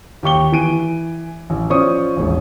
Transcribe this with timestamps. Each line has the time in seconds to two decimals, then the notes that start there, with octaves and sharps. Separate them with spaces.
0.23 D#2 G4 C#6 G7
0.52 E3 G#5 D7 D#7
1.50 A1
1.70 F3 C#4 C5 D5 C#6 D#6
2.17 E1 A1